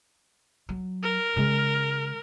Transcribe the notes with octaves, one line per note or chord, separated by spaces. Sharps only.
F#3
A#4
C#3 G#3